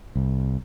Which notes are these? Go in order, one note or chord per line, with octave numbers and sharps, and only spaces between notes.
C2